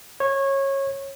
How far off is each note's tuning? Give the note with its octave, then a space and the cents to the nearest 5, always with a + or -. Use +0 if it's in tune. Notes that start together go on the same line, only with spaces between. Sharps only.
C#5 -20